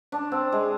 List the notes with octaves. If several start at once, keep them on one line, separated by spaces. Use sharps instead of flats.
D4
C4
G#3